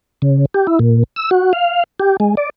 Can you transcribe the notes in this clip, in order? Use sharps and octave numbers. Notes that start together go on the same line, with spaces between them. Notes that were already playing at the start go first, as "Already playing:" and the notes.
C#3
G4
E4
A#2
E6
F#4
F5
G4
G#3
D5